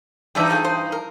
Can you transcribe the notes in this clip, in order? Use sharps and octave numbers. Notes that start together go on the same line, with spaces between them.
G2 E3 D#4 G4 D5 E5
F3 A3 G#4
C5
A#4